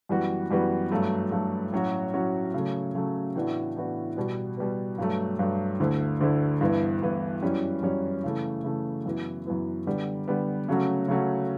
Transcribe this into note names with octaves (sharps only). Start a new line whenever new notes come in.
F#2 E3 G3 B3 F#4
F#2 E3 G3 B3 F#4
G2 F#3 A3
G2 F#3 A3
A2 F#3 C#4 F#4
A2 F#3 C#4 F#4
C#3 F#3 A3
C#3 F#3 A3
A2 E3 B3 D4 F#4
A2 E3 B3 D4 F#4
B2 G3 B3
B2 G3 B3
G2 F#3 A3
G2 F#3 A3
D2 D3 A3 E4
D2 D3 A3 E4
G2 E3 B3 E4
G2 E3 B3 E4
F#2 E3 G3 C#4
F#2 E3 G3 C#4
C#3 E3 A3
C#3 E3 A3
F#2 E3 B3 E4
F#2 E3 B3 E4
D3 G3 B3
D3 G3 B3
C#3 F#3 A3 C#4 F#4
C#3 F#3 A3 C#4 F#4